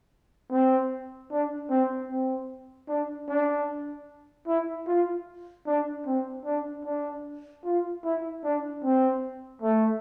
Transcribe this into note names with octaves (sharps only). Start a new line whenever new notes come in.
C4
D4
C4
C4
D4
D4
E4
F4
D4
C4
D4
D4
F4
E4
D4
C4
A3